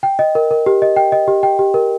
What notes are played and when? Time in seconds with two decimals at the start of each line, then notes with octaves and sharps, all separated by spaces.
0.03 G5
0.19 D#5
0.35 A#4
0.51 A#4
0.66 G4
0.82 D#5
0.96 G5
1.12 D#5
1.27 G4
1.43 G5
1.59 G4
1.74 A#4